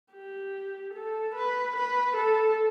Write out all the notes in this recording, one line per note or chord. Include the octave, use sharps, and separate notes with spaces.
G4
A4
B4
B4
A4